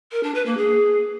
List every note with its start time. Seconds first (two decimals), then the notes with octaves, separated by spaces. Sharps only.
0.12 A#4
0.23 D4
0.35 B4
0.46 A#3
0.57 G#4